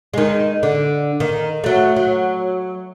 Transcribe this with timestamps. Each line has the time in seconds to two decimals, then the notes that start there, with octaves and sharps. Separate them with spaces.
0.14 D#3 G#3
0.63 D3
1.20 D#3
1.64 F#3 A3
1.96 F#3